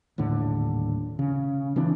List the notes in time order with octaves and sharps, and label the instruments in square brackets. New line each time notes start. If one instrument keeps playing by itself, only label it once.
[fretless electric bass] D#1 A2 D3
C#3
C#3 E3 C4 D4